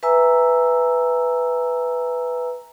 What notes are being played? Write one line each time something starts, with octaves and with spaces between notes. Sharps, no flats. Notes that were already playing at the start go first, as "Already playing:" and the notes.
B4 E5 G#5 A#5 E6